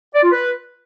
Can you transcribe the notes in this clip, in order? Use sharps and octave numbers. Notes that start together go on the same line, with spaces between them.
D5
F4
B4